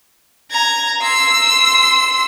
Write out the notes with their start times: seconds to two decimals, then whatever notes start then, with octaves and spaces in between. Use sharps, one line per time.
0.51 A#5 G#6
1.02 C6 E6